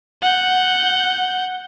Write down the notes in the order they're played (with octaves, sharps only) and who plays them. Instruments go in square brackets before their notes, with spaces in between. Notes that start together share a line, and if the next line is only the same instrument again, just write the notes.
[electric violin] F#5 G6